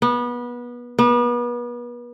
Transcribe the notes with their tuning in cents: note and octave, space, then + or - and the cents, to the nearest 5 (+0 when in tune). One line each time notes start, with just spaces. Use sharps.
B3 -25
B3 -35